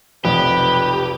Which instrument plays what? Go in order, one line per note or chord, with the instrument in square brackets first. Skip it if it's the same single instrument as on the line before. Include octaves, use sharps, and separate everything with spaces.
[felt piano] F1 B1 F2 [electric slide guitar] G4 [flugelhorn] B4